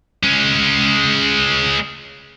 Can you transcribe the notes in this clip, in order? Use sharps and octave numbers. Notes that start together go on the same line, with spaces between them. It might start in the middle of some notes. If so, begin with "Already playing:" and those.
G#3 C#4